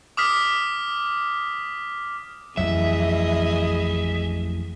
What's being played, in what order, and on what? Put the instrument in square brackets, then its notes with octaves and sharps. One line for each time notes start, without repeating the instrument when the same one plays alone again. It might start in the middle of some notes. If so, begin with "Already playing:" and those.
[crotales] D6 D#6 F6 B6
[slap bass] A1 F2 F#3 [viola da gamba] E3 G#4 D#5 [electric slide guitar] E5